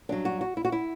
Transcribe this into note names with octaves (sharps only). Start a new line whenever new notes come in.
G2 F#3 D4
F#4
F#4
E4
F#4
E4